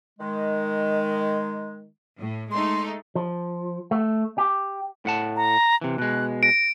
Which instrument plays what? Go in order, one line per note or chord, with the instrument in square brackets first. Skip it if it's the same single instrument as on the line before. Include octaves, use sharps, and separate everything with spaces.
[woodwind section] D#3 G#3
[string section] A2
[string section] G#3 A3 D#4 [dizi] C6
[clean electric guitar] F3
A3
G4
A2 F#5 A5
[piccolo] A#5
[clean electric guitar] C3 E3
[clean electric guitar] B2 G#3 [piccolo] F#6
[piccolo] A#6 [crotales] D7